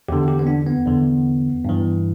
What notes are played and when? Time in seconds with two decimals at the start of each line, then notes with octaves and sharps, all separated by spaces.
0.08 E2 D3 G4
0.28 G4
0.39 B3
0.47 D4
0.66 B3
0.86 E2 D3
1.65 G2 E3